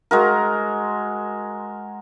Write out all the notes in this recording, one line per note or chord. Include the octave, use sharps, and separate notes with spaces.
G#3 F#4 A#4